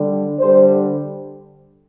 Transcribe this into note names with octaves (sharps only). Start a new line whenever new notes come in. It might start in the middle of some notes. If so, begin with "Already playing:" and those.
Already playing: D3 G3
D3 G3 C5